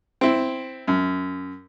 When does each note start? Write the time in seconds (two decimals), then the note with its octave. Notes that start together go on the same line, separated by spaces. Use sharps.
0.21 C4 E4
0.88 F#2